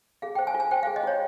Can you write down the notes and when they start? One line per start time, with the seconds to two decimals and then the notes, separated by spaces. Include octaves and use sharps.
0.22 G#4 F5
0.35 C5 G5
0.47 G#5
0.54 F4
0.60 G#5
0.71 C5 G5
0.83 G#4 F5
0.96 D#5
1.03 F4 C#5